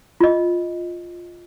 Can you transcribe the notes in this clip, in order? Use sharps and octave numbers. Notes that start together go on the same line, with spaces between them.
F4 D#5